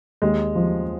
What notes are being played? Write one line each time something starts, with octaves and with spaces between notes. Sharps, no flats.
D#2 G#3
F3